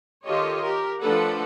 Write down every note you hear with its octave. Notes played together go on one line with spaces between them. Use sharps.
D#3 F4 G4 A4 C#5 D#5
G4 A#4
F3 A3 D4 A4 B4 F#5